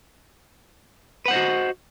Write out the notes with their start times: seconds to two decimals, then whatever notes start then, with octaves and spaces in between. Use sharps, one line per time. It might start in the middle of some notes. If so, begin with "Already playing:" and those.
1.26 B4
1.28 F#5
1.31 C5
1.33 D#5
1.36 F#4